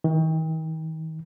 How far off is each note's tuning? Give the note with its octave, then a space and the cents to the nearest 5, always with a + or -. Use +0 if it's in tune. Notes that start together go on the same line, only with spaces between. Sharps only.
D#3 +40